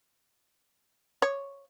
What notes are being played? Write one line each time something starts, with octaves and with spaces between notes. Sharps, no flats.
C#5